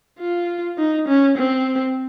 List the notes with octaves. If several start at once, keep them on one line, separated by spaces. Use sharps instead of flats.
F4
D#4
C#4
C4